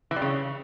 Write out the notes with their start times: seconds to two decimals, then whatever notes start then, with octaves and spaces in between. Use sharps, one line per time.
0.11 E3
0.16 G3
0.22 C#3